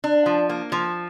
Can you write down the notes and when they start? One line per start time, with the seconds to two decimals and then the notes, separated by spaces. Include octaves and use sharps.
0.04 D4
0.26 F3
0.49 A#3
0.72 F3